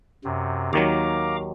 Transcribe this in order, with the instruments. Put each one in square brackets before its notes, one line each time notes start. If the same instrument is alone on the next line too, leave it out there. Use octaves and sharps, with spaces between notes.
[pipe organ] F#2 C3
[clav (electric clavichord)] D#2 D#3 F#3 [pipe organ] F5 A#5 D6